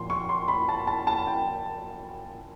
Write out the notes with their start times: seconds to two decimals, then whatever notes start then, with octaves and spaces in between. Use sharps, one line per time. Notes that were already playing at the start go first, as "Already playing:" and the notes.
Already playing: A#2 F3 C6
0.10 C#6
0.29 C6
0.48 B5
0.69 A5
0.87 A5
1.07 A5
1.27 G5